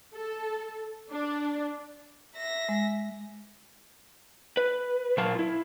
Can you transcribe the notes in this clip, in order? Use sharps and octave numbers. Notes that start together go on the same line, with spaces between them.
A4
D4
E5 A#6
G#3
B4
A#2 F#3 A#4 F5 A5
E4 F4